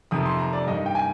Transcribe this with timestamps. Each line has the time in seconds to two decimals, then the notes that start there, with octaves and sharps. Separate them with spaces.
0.11 F2 C3 D#3 D#6
0.26 C6
0.39 A#5
0.53 D5
0.67 G2 D#5
0.71 D#3
0.86 G5
0.95 G#5